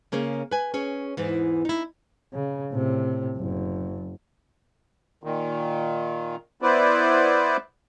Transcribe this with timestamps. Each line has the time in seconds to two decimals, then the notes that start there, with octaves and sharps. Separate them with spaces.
0.12 C#3 A#3 C#4 G#4
0.51 B4 G#5
0.74 C#4 G#4 C#5
1.17 E2 G#2 E3
1.65 D#4 E4
2.33 C#3
2.72 A2 C3
3.37 F#1
5.23 A#2 D#3
6.62 B3 E4 B4 C5 D5